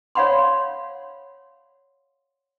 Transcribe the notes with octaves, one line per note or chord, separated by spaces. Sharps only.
C#5 D5 F5 F#5 B5 C6